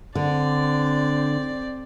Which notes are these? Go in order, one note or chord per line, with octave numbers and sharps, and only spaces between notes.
D3 C4 D5